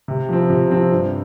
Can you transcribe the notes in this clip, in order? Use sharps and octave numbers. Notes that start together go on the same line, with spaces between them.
C3
F3 C4
C3
F3 C4
G2